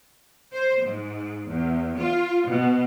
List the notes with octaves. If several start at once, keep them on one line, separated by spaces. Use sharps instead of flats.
C5
G#2
E2
F4
B2